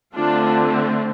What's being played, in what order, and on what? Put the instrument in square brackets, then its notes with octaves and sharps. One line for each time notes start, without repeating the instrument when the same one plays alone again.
[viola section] D3 A3 C4 D4 F4